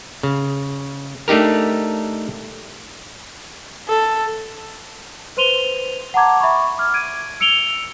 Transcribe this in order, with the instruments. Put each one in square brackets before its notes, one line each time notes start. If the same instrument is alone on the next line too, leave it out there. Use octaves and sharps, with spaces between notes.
[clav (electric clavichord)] C#3
A3 D4 D#4 G4 A#4
[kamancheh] A4
[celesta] B4 C5 C6 D#7 F7 G7
F#5 A5 A#5 D6 G#6
E5 B5 C#6
D6 F6 G#6
G#6 D7 D#7
E6 C#7 D7 F7 G7